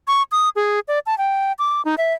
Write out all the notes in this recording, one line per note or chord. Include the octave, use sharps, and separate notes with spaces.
C#6
D#6
G#4
D5
A5
G5
D6
D#4
E5